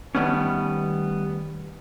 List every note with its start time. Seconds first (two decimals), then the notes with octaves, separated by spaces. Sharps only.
0.15 D#3 G3 A3 B3 C#4